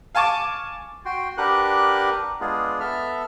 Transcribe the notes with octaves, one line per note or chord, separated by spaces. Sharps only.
F5 G#5 A5 C#6 D6
F#4 G5 C6
D4 G4 A#4 B4 F#5 F#6
G#3 B3 D4 F4 G#4
B3 A4 E5 F6